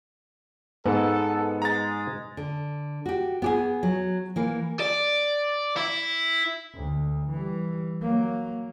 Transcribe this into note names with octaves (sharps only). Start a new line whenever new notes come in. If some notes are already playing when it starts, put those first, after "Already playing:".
G#2 B3 A4
G#3 A#5 A6
D3
F#4 G4
B3 G4 G#4
F#3
E3 A#3
D5
E4
D2
E3 G3
F#3 A#3